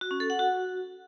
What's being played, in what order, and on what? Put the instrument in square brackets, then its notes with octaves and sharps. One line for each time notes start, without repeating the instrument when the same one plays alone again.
[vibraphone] F#4
C#4
A4
F#5
F#4